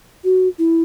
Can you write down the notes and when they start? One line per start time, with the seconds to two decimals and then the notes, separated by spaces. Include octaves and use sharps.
0.24 F#4
0.59 E4